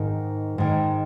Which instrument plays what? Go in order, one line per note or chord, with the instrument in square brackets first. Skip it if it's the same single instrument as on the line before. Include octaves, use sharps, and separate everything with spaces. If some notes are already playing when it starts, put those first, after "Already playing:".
Already playing: [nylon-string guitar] G#2 D#3
G#2 D#3